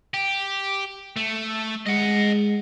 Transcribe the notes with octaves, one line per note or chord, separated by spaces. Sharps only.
G4
A3
G#3 D#5 F#5